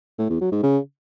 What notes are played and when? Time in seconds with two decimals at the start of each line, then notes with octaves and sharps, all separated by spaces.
0.19 A2
0.30 E2
0.41 F#3
0.52 G#2
0.63 C#3